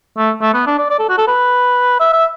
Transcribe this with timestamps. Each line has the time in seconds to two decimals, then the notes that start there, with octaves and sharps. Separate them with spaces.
0.17 A3
0.42 A3
0.54 B3
0.67 D4
0.78 D5
0.90 D5
0.99 A4
1.09 F#4
1.18 A4
1.28 B4
2.00 E5
2.13 E5